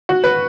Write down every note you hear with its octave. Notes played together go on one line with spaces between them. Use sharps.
F#4
B4